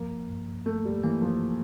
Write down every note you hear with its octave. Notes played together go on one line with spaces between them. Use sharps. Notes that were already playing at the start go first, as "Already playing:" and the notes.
Already playing: F3 A#3
G2
A3 A#3
G3
E3 A#3
F3